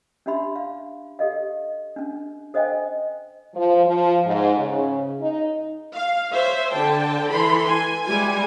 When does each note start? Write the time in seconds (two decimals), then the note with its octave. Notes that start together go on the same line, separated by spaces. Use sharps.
0.26 C#4 D4 G4 E5 B5 C6
0.56 F5
1.19 G4 A4 D#5 F5
1.96 C#4 D4
2.54 A4 C5 D#5 F5 G5 G#5
3.55 F3
3.87 F3
4.25 G#2
4.59 C#3
5.20 D#4
5.94 F5
6.32 C5 C#5 E5
6.72 D3 G5 A5
7.30 E3 A4 B5 C6
7.67 G#5
8.04 G3 G#3 E4 G#5